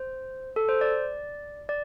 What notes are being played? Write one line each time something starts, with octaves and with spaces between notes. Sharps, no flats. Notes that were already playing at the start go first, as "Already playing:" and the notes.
Already playing: C5
A4
C5
D5
D5